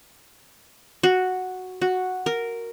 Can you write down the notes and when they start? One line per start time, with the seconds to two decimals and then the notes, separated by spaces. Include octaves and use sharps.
1.03 F#4
1.82 F#4
2.26 A#4